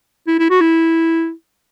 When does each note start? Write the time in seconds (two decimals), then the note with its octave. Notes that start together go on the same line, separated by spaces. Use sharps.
0.27 E4
0.39 E4
0.50 F#4
0.61 E4